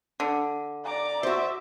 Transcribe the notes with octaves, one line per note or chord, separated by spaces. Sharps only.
D3
D5 A#5 D6
F#4 C5 E5